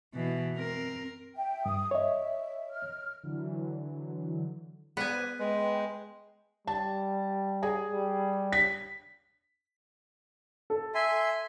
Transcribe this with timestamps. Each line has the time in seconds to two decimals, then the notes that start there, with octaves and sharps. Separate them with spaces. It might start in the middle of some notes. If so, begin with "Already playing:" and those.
0.14 B2 E3
0.56 C4 A#4
1.36 E5 G5
1.66 G2 D#6
1.91 C#5 D#5 E5
2.71 F6
3.23 D3 E3 F#3
4.97 B3 B4 C5 D5 G#5
5.39 G#3 B4 G5
6.67 G3 A5
7.63 G#4
7.91 G3
8.52 B6
10.70 A4
10.95 E5 G#5 C6